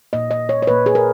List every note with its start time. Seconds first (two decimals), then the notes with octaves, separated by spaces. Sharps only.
0.13 A#2 A#3 D#5
0.31 D#5
0.49 C#5
0.62 C#5
0.67 A#2 A#3 B4
0.86 G#4
0.95 A#4